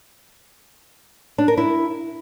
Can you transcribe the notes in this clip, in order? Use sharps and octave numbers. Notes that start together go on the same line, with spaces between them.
D4
A#4
E4